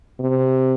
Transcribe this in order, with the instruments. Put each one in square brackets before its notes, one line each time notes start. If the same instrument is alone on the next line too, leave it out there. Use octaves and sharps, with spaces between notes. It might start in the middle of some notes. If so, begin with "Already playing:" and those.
[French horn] C3